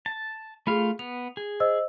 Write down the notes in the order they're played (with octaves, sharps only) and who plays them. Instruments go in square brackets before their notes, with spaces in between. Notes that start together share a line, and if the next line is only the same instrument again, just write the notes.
[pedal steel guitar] A5
[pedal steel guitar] A3 F4 F5 [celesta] G#4 B5
[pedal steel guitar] B3 [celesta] F7
[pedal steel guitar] G#4
[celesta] C5 D#5 E6